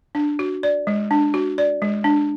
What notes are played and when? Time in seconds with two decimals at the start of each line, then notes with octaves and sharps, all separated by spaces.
0.15 D4
0.39 F#4
0.63 D5
0.87 G#3
1.11 D4
1.34 F#4
1.58 D5
1.82 G#3
2.04 D4